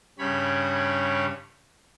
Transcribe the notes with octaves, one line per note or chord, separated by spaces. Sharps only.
G2 C#3 G3 C#5 B5